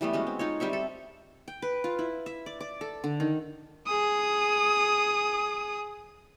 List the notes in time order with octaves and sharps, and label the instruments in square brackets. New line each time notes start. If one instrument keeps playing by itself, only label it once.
[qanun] E3 G3 A3 B3
G#3 C#4 F#4
C4
D#4 F4 C#5
G3 C4 E5 C#6
A4
G5
B4
F4
E4
E5
D5
D5
A4
D3
D#3
[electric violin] G#4 D#6